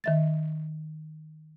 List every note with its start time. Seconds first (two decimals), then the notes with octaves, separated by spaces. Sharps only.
0.04 D#3 E5 A6